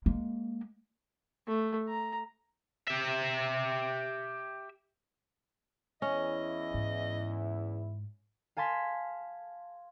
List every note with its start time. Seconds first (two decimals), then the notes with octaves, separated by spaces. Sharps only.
0.06 G#3 A#3
1.47 A3
1.88 A#5
2.88 G4 E5
6.02 E2 C#4 E4 D#5
6.74 G#2
8.57 F5 G#5 A5 C6 B6